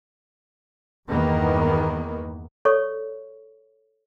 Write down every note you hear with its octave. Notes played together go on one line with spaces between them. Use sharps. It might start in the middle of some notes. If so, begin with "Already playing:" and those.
E2 G2 D#3 A#3 B3
A4 C#5 D5 C#6